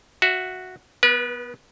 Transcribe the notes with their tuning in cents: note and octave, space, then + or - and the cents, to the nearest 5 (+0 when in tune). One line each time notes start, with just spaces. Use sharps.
F#4 -5 E5 +5
B3 +0 B4 -35